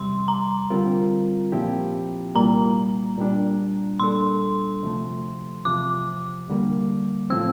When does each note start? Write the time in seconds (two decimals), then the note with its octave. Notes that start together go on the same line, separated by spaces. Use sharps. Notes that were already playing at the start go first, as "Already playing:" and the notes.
Already playing: E2 C3 G3 C6
0.28 A#5
0.70 D3 G3 C4 F4 A#4
1.52 A#2 F3 C4 E4 G4
2.35 C2 A#2 G3 A#3 A#5
3.18 A#2 G3 D4
4.00 A#2 G3 D4 A4 C6
4.83 D2 C3 F3 A3
5.65 E2 C3 F3 D6
6.48 D2 D3 G3 A#3
7.30 A2 F3 C4 E6